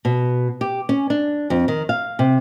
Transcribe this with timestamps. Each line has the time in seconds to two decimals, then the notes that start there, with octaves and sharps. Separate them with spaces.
0.05 B2
0.61 G4
0.89 C#4
1.10 D4
1.50 F2
1.68 D#3
1.89 F5
2.19 C3